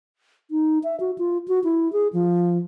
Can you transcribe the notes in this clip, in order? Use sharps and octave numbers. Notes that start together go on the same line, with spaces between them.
D#4
E5
F#4
F4
F#4
E4
G#4
F3